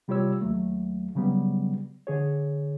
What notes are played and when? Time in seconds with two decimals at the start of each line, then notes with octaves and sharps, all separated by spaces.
0.08 C3 G3 F4 G4 C#5 E6
0.41 D#2 F#3 A3
1.15 C#3 F#3 G3 B3
2.07 D3 G#4 C#5